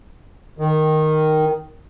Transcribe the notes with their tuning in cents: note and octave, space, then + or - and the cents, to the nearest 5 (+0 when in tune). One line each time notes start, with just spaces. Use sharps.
D#3 -5